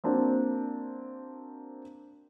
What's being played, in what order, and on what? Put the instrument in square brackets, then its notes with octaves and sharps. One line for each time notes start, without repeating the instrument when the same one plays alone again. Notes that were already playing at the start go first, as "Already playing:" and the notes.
[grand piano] A#3 C4 D4 F#4